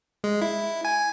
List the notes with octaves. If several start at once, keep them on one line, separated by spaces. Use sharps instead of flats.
G#3
E4
G#5